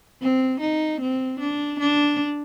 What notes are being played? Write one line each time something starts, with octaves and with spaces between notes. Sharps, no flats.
C4
D#4
C4
D4
D4